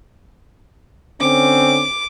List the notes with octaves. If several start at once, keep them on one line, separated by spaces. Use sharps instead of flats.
D3 C4 C#4 D6